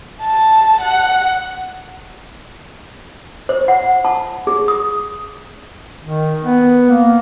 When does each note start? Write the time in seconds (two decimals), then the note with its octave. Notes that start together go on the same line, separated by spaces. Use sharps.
0.20 A5
0.81 F#5
3.49 C5
3.68 F#5
4.05 A5
4.47 G#4
4.68 D#6
6.02 D#3
6.43 B3
6.90 A#3